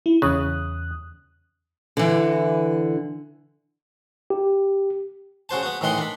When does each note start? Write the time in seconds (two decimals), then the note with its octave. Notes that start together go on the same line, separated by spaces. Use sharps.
0.06 E4
0.22 E2 C#3 D#6 F#6
1.97 D3 E3
4.30 G4
5.49 C#3 F#4 C5 A5
5.63 B3 F#4
5.81 A2 D#3 E3 D#5 F#5 C6
5.98 D4 B5